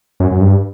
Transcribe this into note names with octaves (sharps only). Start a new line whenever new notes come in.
F#2
F#2
G2